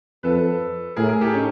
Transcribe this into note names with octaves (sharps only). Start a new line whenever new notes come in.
F2 A4 B4
A2 G#4 A#4
G#4 A#4
G4 A4
C#4 D#4